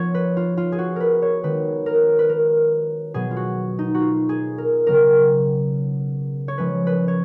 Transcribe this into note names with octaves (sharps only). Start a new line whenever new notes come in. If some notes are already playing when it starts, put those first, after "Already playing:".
Already playing: F3 B3 F4 C#5
B4
F4
F4
G#4
F#4
A#4 B4
C#5
D#3 G#3 B3 B4
A#4
B4
A#4
B2 F#3 B3 G#4
F4
F#4
D#4
F#4
F4
G#4
A#4
C#3 F#3 B3 A#4
C#5
F3 G#3 C#4 B4
B4
C#5